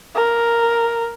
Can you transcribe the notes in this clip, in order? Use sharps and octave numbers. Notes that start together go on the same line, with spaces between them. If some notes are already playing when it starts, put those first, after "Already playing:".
A#4